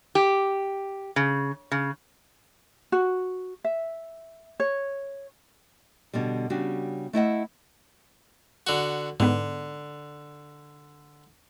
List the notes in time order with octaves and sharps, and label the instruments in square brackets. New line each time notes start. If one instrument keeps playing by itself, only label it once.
[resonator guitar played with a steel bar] G4
C#3
C#3
[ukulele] F#4
E5
C#5
[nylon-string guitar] B2 D3 G3
C#3 G3 D4 F#4 G4
A3 E4 D#5 F#5
[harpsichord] D3 F#4
[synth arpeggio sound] G#2 B3 [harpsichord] D3